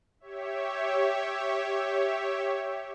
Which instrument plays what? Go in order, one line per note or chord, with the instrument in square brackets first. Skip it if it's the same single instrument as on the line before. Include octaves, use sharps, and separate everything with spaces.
[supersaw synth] G4 C#5 E5